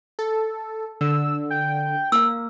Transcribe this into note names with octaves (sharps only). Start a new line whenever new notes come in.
A4
D3 E6
G5
A#3 F5 E6